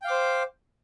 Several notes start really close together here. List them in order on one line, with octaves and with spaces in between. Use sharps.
G5 F5 D6 C5